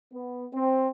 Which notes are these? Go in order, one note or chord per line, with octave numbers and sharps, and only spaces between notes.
B3
C4